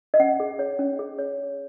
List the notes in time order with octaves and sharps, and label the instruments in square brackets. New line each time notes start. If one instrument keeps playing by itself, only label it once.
[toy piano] D#5
C#4 F#5
G#4
C#5
C#4
G#4
C#5
C#5